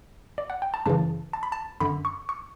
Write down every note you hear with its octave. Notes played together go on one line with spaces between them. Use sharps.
D5
F#5
G5
A5
F#2 C#3 E3 A5
A5
B5
A5
F#2 D3 B5
C#6
C#6